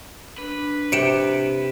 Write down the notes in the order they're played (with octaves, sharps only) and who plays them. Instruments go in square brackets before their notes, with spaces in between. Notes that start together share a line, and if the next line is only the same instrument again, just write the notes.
[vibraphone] D4 [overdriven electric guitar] B4
[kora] C3 G5 [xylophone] C#7 D7 E7